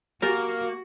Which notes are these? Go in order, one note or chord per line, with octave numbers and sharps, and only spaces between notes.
A#3 F#4 G4 A#4 G#5 A6